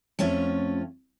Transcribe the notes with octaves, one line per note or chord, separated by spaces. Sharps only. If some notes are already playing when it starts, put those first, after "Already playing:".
F2 A3 C#4 F4 C#5